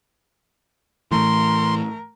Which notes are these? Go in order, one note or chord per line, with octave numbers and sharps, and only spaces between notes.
A2 E3 A3 A#4 C6